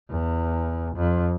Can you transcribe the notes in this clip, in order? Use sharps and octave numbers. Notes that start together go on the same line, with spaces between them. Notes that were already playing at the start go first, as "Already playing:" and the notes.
E2
F2